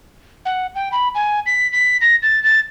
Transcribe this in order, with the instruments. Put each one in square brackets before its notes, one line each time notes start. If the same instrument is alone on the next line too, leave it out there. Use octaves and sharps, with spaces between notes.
[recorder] F#5
G5
B5
G#5
B6
B6
A#6
A6
A6